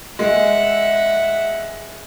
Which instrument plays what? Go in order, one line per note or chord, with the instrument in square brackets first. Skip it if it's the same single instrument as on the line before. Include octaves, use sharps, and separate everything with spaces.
[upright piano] G#3 [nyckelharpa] E5 F#5